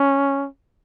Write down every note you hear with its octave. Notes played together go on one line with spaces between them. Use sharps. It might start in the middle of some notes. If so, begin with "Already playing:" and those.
Already playing: C#4